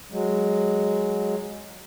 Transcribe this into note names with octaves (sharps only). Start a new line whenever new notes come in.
F#3 G#3